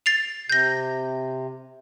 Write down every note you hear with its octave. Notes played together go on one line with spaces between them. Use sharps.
A6 C7 F7
C3 G6 A#6